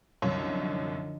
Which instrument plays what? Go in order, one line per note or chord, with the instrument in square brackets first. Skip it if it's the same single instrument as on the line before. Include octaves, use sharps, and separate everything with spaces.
[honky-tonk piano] C2 F#2 C#5 [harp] D3 D#3 F3